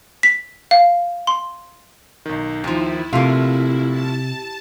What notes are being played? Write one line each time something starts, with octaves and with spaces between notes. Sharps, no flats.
B6
F5
C6
B1 D#3
D#2 D#3 F3 E4
A#1 C3 A3 A#3 F4 E5
A5